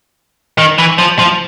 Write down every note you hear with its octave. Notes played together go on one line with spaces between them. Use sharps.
D#3
E3
F3
F3